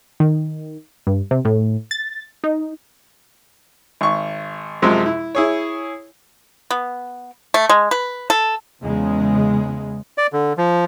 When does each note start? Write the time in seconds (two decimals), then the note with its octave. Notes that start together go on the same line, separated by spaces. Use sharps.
0.20 D#3
1.07 G2
1.31 C3
1.45 A2
1.91 A6
2.44 D#4
4.01 G#1 C#6
4.82 F#2 C3 F3 G#3
5.06 E4
5.35 E4 G#4 C#5
6.71 B3
7.54 A3
7.69 G#3
7.91 B4
8.30 A4
8.83 E2 C#3 G#3
10.18 D5
10.33 D3
10.58 F3